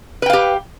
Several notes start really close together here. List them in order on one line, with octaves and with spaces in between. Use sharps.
B4 G5 F5 G4